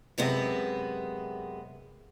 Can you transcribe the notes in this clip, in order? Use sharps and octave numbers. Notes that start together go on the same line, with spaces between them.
F#2 C3 G#3 B3